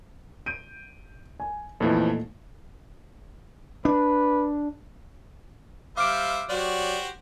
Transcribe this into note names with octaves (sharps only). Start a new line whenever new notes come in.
G6 D7 D#7
G#5
F2 A#2 E3 F3 A3 D#4
D4 B4
G3 C5 E5 F5 D6 F6 D7
F#3 F#4 G4 C5 D5